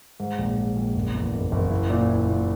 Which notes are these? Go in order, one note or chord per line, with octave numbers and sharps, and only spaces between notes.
G#2
A#1
G#2
A#1
F#1
E2
F#1
F#1
E4
A#2
E4
A#2